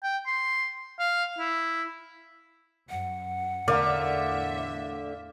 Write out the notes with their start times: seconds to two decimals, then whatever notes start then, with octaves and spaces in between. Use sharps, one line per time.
0.03 G5
0.27 C6
0.99 F5
1.39 E4
2.90 F#2 F#5
3.68 E2 A2 D3 A#4 D5 E5 F5 C6